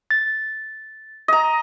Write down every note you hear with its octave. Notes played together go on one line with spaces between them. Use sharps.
A6
D#5 A#5